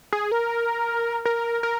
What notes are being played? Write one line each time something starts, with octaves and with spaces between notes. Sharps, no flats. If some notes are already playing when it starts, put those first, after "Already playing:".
G#4
A#4
A#4
A#4